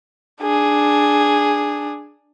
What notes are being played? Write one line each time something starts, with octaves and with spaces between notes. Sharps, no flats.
D4 G#4